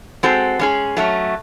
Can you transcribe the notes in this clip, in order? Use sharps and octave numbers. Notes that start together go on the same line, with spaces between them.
G#3 C4 F#4 A4
G#3 C#4 G#4
F#3 A3 C#4